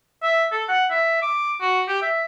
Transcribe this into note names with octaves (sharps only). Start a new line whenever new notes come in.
E5
A4
F#5
E5
D6
F#4
G4
E5